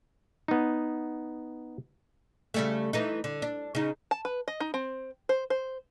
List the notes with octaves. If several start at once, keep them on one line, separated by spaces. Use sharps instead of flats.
B3 D#4
C#3 G3 A3
E3 A3 D#4
D3
D4
C#3 D#4
A5
B4
D#5
D#4
C4
C5
C5